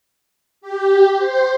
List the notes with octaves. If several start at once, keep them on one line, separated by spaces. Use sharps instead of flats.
G4
C5